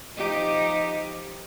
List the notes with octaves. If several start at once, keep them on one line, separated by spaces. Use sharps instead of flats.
F3 D#4 G4